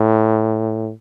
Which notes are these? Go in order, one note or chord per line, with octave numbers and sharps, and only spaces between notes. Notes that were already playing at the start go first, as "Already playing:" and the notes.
Already playing: A2